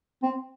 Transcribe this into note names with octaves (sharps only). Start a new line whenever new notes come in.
C4